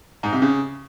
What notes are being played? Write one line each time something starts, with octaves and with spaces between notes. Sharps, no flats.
G#2
C3
C#3